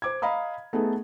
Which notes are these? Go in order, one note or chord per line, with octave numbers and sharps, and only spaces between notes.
C5 D6 G#6
D#5 F5 A#5 B5 D#6
A3 B3 D#4 G#4 A4